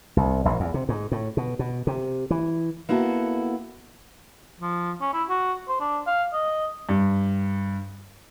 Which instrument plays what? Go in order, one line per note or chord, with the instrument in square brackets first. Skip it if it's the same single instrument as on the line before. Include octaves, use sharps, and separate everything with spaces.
[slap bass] C2
A#1
E2
C3
G#2
A2
B2
B2
C3
E3
[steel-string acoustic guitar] A#3 B3 E4 F#4 A4
[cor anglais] F3
C#4
E4
F#4
C5
D4
F5
D#5
[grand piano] G2